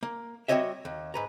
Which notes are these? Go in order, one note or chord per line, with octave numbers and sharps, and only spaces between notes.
A#3
G3 C4 F#4 C#5 D#5 E5
D#2
G#2 B4 A#5